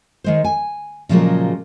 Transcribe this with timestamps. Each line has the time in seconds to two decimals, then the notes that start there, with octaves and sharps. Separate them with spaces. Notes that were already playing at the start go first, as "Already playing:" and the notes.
0.24 D#3 G#3 C5
0.44 G#5
1.09 A#2 C#3 F3 F#3 G#3 A#3